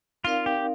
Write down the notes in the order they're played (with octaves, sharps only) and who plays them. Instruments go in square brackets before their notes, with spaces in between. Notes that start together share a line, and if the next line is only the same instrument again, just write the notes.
[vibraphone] C4 D#4 A#4 D5 F5 [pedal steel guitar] F4
[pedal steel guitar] G4